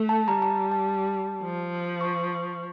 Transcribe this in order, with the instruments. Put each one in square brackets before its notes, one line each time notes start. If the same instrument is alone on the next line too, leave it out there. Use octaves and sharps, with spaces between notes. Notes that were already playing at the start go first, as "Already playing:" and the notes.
Already playing: [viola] A3
[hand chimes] A5
[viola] G3 [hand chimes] A#5
[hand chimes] A5
A5
[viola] F3
[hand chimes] C#6